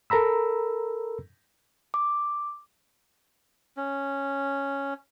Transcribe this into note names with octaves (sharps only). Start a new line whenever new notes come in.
A4 A#4 A#5 B5 E6
D6
C#4